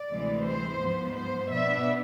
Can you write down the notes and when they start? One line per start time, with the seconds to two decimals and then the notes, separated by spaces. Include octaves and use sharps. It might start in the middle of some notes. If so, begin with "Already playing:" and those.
Already playing: D5
0.11 D2 C3 E3 G#3
0.46 C5
0.81 G#2 F3 B3
1.15 C5
1.50 B2 B3 D4 E5